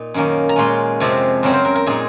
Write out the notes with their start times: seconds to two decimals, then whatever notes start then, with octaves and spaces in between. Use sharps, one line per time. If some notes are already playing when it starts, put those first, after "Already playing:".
Already playing: A#2 D#4
0.14 F#2 D#3 A#3 C#4
0.49 A#5
0.56 A#2 G#3 C#4 F4 C6
1.00 F2 C3 F3 G#3 C4
1.43 F#2 C#3 F#3 C4
1.53 C5
1.65 A#4
1.76 A#4
1.86 A#2 G#3 D#4 G#4